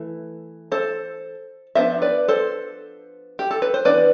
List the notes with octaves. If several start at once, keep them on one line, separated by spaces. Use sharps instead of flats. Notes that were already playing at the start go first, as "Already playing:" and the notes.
Already playing: E3 A3
A4 C5
F3 B3 D4 C5 E5
B4 D5
A4 C5
G4
A4
B4
C5
E3 B3 D4 B4 D5